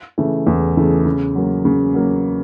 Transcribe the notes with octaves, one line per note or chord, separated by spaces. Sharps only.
C#3 E3 A3
E2
C#3 E3 A3
C#3
F#3 A#3
C#3
F#3 A#3